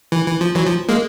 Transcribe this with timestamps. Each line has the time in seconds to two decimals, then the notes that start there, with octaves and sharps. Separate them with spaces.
0.12 E3
0.26 E3
0.41 F3
0.55 E3 F#3
0.67 F3
0.89 G#3 A#3